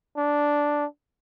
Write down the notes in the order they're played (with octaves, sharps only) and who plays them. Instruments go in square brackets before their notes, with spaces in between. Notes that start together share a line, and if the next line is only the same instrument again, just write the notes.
[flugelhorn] D4